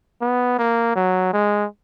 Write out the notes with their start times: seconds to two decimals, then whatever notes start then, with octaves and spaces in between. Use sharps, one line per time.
0.21 B3
0.59 A#3
0.96 F#3
1.33 G#3